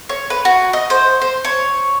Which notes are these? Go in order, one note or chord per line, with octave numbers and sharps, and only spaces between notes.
C#5
B4
F#4
D#5
C5
C5
C#5